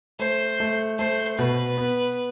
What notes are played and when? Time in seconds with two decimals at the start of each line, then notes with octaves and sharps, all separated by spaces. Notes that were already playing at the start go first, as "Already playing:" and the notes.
0.19 A3 C5
0.60 A3
0.99 A3 C5
1.38 B2 B4
1.78 B3